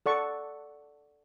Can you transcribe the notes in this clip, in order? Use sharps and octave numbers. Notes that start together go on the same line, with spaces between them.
A4 D5 F#5 C#6